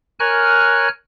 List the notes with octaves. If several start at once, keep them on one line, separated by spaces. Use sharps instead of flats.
A#4 C#5 G#5 F6 F#6